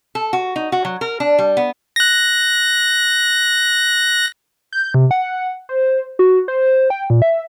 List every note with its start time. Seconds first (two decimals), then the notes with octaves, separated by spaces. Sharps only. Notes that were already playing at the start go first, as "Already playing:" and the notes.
0.15 A4
0.33 F#4
0.56 D#4
0.72 F#4
0.85 F#3
1.01 A#4
1.20 D4
1.39 G3
1.57 B3
1.96 F#6 A#6
4.73 G6
4.94 C3
5.11 F#5
5.69 C5
6.19 F#4
6.48 C5
6.90 G5
7.10 A#2
7.22 E5